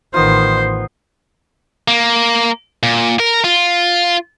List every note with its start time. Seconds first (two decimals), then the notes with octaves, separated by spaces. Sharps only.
0.14 A1 D#3 B3 D#4 F4 C5
1.88 A#3
2.83 A#2
3.20 A#4
3.44 F4